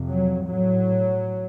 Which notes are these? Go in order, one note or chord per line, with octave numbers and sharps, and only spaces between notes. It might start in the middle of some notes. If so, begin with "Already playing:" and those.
Already playing: F2 C3
F#3
A2 F#3